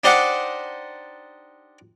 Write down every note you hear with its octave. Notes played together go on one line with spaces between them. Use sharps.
D4 D#4 G4 C5 D5 F#5